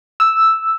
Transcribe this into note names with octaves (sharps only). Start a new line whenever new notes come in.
E6